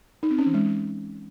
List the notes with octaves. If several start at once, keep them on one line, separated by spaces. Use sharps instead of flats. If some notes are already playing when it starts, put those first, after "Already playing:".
D#4
C4
C#4
E3
G#3